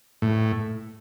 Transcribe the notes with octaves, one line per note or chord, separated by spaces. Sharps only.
A2